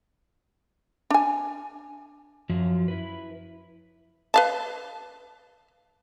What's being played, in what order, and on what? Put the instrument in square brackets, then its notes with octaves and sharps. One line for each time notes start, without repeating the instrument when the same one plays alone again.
[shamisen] D4 G#5
[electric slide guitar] F#2 F3 F#3
E4 B4
[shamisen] B4 F5 A5